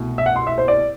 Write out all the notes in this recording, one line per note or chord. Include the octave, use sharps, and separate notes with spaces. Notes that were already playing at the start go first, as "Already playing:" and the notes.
Already playing: C2 B2 A3
E5
F#5
C6
E5
C5
D5